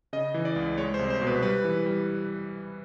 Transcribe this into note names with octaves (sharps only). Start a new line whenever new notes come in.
C#3 D#5
E3
D5
C#2
G#3 C#5
C5
C2
C5
B2
B4
G3 B4
E3
G3